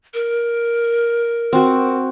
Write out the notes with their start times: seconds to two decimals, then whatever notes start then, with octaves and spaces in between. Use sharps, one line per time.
0.14 A#4
1.53 C4 F#4